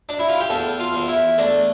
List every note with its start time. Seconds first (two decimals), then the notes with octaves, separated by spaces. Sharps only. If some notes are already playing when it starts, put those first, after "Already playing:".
0.09 D4
0.19 E4
0.29 F4
0.40 G4
0.49 E2 A4
0.80 F4
0.94 E2
1.08 E4
1.38 A3 D4